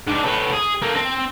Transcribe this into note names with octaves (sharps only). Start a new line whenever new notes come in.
G#2 D4
A2 B3
G#4
A#3 A4
C4